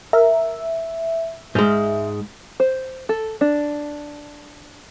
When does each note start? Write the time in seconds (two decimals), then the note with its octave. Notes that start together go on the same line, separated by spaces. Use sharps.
0.13 A#4 E5
1.55 G#2 G#3 F6 G6
2.60 C5
3.09 A4
3.41 D4